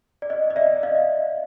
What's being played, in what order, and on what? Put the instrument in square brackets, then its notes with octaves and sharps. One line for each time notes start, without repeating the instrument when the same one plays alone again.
[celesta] D5
D#5
D#5
D5 E5
D#5 F5